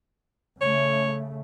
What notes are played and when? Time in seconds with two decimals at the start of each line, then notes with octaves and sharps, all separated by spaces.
0.61 C#3 A3 C#5